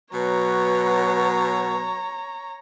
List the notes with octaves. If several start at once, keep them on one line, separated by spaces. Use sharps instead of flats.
B2 F#3 B4 C#5 A#5